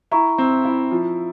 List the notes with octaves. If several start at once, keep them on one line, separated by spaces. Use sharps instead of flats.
E4 A#5 C#6
C4
E4
F3